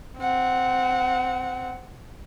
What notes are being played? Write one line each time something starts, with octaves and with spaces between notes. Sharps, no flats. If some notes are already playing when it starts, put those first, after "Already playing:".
C4 F#5